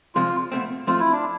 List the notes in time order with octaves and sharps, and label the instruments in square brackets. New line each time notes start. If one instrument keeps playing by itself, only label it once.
[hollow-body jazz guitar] C2 C3 F3 G#3 C4 [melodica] F4
[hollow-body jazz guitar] B2 A3 C4
[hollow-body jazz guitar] G#2 F3 A3 C4 [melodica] F4
[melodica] E4
D4